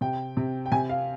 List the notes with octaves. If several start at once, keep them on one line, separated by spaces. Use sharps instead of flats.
C3 G5
C3
G5
C3 G#5
F5